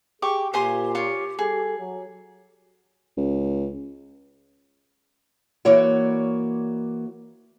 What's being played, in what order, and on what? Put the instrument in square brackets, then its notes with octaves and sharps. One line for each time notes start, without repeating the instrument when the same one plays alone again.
[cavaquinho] G4 C#6 D6 [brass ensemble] G#4
[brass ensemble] A#2 [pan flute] G4 [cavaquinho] C5 G#5 C6
[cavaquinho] F4 C#5
[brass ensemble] G3 A4 [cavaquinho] G#4
[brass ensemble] F#3
[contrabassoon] C#2
[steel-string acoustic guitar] E3 A#3 F#4 C#5 D5